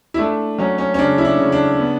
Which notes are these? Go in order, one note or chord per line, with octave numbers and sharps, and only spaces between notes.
E4
A3 D4
F#3 C#4
C#4
C#4
C#3 D4
E4
D4
C#3
D4
B3